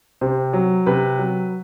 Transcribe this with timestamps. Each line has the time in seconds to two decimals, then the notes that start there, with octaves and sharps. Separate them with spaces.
0.21 C3 C5
0.53 F#3
0.86 C3 B4
1.19 F#3